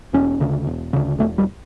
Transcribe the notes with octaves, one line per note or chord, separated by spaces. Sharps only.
E1 C#4
D2 C#3
E1
D2 C#3
E1 A3
G3